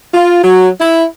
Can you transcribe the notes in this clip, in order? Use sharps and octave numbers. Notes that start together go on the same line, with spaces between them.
F4
F#3
E4